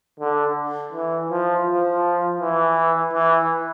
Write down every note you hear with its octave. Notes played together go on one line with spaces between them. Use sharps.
D3
E3
F3
F3
E3
E3